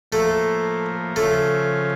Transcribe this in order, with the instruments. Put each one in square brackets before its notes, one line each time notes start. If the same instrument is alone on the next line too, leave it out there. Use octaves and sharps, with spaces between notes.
[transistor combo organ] A2 F3 A#3 [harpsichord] A3
[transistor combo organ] C#3 F3 C#4 F4 [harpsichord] A3